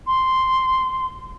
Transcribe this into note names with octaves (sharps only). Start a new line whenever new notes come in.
C6